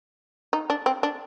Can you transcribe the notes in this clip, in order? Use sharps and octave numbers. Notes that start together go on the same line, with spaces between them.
D#4
D4
C4
D4